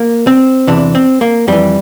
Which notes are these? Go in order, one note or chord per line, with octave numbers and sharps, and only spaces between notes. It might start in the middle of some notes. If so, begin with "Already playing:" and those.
Already playing: A#3
C4
E2 C3 E3 D4
C4
A#3
F2 E3 G3